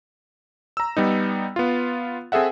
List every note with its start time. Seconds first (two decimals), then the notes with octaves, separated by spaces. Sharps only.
0.77 A#5 E6
0.97 G3 B3 D#4
1.56 B3 F4
2.32 C4 G#4 A4 E5 F#5